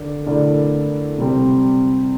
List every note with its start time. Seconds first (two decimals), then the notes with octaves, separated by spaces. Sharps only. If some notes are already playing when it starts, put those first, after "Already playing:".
Already playing: D3 A#4 D5
0.26 D3 A3 E4 A#4 D5
1.18 C3 G3 C4